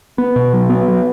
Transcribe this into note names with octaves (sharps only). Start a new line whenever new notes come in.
B3
B2
F#3
B3
F#3